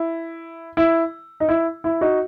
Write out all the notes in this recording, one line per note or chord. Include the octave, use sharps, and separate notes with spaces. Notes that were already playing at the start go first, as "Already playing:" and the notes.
Already playing: E4
E4
D#4
E4
E4
D#4 F#4